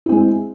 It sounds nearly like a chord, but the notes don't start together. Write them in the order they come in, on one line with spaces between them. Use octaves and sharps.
E4 C4 G#3